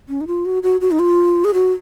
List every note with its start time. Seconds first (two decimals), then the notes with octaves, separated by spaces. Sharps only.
0.09 C#4
0.21 D#4
0.27 F4
0.46 F#4
0.63 F#4
0.81 F#4
0.91 D#4
0.99 F4
1.45 G#4
1.54 F#4